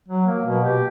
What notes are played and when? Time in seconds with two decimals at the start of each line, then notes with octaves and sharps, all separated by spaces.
0.09 F#3
0.27 A#3
0.46 B2
0.64 G4